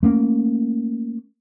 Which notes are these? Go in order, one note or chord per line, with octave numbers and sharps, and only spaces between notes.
A3 A#3 C#4